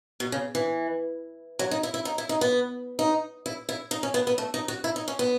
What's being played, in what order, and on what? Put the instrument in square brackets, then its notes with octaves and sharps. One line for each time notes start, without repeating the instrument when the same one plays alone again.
[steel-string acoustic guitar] B2
C#3
E3
F#3
D#4
E4
E4
D#4
E4
D#4
B3
D#4
E4
E4
D#4
C#4
B3
B3
A3
D#4
F#4
E4
D#4
C#4
B3